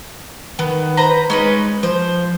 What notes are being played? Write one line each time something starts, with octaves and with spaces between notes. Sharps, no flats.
D#3 B3
B4 C5 A#5
G#3 C#4 D#4 B4
F3 C5